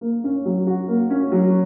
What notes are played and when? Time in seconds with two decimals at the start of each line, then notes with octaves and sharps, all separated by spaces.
0.01 A#3
0.24 C#4
0.45 F#3
0.67 F#4
0.88 A#3
1.10 C#4
1.32 F#3